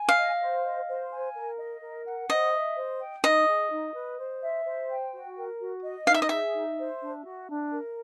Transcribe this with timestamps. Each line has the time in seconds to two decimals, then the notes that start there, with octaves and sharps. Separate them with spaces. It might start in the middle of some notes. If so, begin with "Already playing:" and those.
Already playing: G#5
0.09 F5
0.16 D#5
0.40 C5
0.64 D#5
0.88 C5
1.11 G#5
1.35 A#4
1.58 D#5
1.82 A#4
2.06 F#5
2.30 C5 D#5
2.53 E5
2.76 C5
3.00 G5
3.24 D#4 D#5
3.47 G#4
3.71 D#4
3.94 B4
4.18 C5
4.41 E5
4.65 C5
4.90 G5
5.13 F#4
5.37 A#4
5.60 F#4
5.83 D#5
6.07 D#4 F5
6.14 E5
6.22 D#5
6.29 G#4 E5
6.55 D#4
6.79 C5
7.02 D4
7.25 F#4
7.49 D4
7.72 A#4